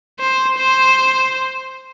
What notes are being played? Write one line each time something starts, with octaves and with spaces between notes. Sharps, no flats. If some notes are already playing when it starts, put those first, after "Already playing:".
C5
C5